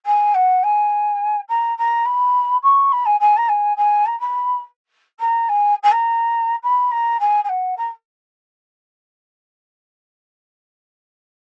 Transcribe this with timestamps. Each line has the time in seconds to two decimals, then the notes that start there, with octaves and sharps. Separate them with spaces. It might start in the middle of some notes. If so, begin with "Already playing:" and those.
0.06 G#5
0.34 F#5
0.63 G#5
1.48 A#5
1.78 A#5
2.05 B5
2.63 C#6
2.92 B5
3.05 G#5
3.20 G#5
3.37 A#5
3.48 G#5
3.77 G#5
4.06 A#5
4.20 B5
5.19 A#5
5.49 G#5
5.83 G#5
5.91 A#5
6.63 B5
6.91 A#5
7.20 G#5
7.44 G#5
7.49 F#5
7.77 A#5